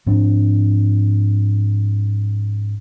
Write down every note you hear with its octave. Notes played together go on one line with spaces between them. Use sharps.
G#2 F3 C4 D4